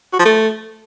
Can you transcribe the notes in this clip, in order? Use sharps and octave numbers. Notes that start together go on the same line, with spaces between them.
F#4
F3
A3